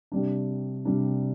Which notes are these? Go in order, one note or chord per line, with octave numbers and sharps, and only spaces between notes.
C3 G3 D4
C3 G3 D4